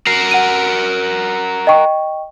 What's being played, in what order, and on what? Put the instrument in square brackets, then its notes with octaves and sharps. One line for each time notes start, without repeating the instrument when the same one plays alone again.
[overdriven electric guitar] F#4 A#4 [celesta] C7
[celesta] F#5 D#7
D#5 G5 C#6